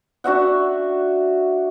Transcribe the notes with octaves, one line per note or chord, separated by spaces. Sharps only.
D4 F#4 E5 F#5